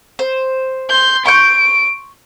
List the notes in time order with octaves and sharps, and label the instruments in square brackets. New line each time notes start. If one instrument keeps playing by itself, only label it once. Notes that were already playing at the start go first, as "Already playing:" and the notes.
[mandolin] C5
[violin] C6 G6
[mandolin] C6 C#6 G6 [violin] D7